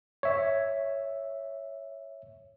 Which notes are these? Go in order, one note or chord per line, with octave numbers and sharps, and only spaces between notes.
C#5 E5